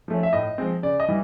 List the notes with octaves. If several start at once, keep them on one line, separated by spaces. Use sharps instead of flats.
F3 A3 C#4
E5
A2 D#5
F3 G#3 C4
C#3 D5
D#5
E3 G3